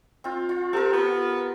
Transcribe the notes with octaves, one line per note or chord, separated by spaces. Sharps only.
C4 F4
F4
C4 G4 A4 A#4
B3